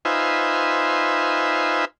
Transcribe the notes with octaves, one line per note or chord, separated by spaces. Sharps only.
D#4 F4 B4 C5 E5 G#5